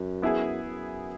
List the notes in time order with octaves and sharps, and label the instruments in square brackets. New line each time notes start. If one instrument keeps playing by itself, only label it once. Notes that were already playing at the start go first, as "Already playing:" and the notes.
Already playing: [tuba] F#2
[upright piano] B3 E4 G#4
[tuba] F#2